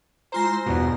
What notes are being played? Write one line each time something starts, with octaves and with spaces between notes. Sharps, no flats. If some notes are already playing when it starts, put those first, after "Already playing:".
G#3 F4 C5 A#5 C6 A#6
E4
E2 G2 B2